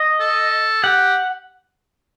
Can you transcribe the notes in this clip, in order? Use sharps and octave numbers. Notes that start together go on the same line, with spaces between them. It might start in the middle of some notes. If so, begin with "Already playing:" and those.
Already playing: D#5
A4
G4 F#5